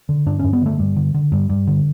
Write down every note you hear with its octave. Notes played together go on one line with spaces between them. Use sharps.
D3
G2 D4
G2 C#4
B3
D3 A3
G2
D3
D3
G2
G2
D3